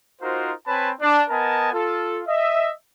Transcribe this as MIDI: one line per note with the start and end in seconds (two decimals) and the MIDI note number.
0.21 0.52 63
0.21 0.52 65
0.21 0.52 66
0.21 0.52 70
0.21 0.52 72
0.67 0.91 60
0.67 0.91 71
0.67 0.91 73
0.67 0.91 80
0.67 0.91 81
0.67 0.91 83
1.01 1.22 62
1.30 1.69 59
1.30 1.69 70
1.30 1.69 75
1.30 1.69 80
1.30 1.69 81
1.72 2.20 65
1.72 2.20 69
2.27 2.70 75
2.27 2.70 76